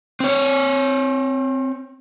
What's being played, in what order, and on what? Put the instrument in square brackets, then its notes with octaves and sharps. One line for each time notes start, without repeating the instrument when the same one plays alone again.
[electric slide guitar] C4 C#5